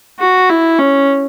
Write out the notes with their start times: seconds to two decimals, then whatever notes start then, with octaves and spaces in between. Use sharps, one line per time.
0.19 F#4
0.50 E4
0.79 C#4